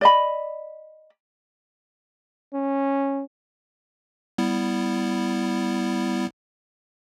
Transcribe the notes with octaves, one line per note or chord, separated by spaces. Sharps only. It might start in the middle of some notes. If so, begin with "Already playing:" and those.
D5 D#5 B5
C#4
G3 B3 E4